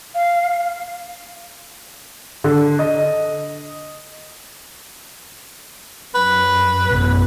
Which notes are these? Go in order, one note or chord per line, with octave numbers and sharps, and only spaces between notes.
F5
D3
D#5
F#2 B4
A1 F#2 B2